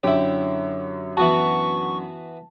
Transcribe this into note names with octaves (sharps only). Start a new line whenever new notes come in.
F#2 D3 E4 G4 C#5
E3 B3 F#4 A5 C#6